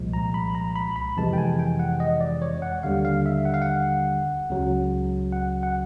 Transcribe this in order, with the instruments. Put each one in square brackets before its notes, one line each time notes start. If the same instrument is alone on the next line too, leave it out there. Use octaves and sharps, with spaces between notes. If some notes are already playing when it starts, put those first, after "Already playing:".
Already playing: [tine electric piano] C2 A#2 F3 G#3
A#5
B5
A#5
B5
B5
F2 C3 E3 G#3 A5
G5
G#5
G5
F#5
D#5
D5
C#5
F#5
D#2 D3 G3 F5
F5
E5
F#5
F5
F#5
C#2 C#3 F#3
F#5
F#5